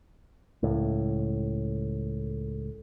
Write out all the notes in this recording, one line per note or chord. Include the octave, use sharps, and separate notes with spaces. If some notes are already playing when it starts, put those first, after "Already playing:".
C#2 A2